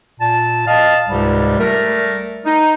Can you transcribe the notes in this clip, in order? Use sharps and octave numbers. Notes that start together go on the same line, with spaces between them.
A#2 A5
D#5 F5 A5
C#2 G#2 C3 G3
G3 A3 A#4
D#4